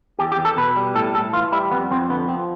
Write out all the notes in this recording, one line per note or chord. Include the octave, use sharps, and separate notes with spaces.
E2 G4
G4
E2
A4
B2 B4
G3
A2 A4
A2 A4
E3 F4
G3 E4
F2 B3
F2 C4
D3 B3
F3 C4